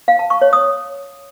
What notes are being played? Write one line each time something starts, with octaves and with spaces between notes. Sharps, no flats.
F5
A5
C#6
C#5
D#6